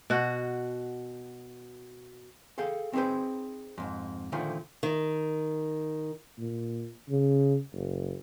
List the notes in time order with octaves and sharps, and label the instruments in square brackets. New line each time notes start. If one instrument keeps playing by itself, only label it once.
[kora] B2 F#4
[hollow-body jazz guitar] G#4 A4 F5 G5
C4 D#4 G#4 B4 C5
F2 G#2
A#2 D3 D#3 F3 A3
[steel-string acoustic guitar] D#3
[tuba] A#2
C#3
F#1